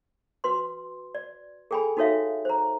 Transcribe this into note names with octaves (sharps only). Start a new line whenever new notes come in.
F#4 B4 C6
D5
G#4 A4 G5 G#5 B5
D#4 F#4 A4 C#5 E5 F5
C5 A#5